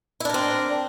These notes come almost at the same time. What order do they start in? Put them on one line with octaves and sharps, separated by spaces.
E4 D4 A#4 C4